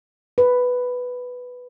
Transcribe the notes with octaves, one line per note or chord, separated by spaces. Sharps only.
B4